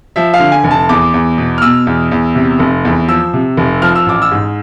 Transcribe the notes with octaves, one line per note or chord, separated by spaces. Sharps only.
F3 E5
F5
D3
G#5
F1
A5
E2 D6
E2
B2
F6
B2 E6
E2
E2
C3
F1
E2
F3 E6
C3
F1
F3 F6
E6
A1 D6
E6
G#2